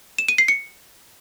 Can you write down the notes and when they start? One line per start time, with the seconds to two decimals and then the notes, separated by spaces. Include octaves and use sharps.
0.18 E7
0.28 D#7
0.38 C7
0.48 C#7